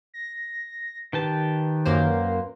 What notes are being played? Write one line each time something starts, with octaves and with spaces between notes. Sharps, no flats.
A#6
D#3 G4 B4 A5
F#2 A#3 C5